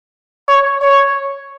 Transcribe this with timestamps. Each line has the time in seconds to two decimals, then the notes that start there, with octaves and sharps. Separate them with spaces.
0.48 C#5
0.82 C#5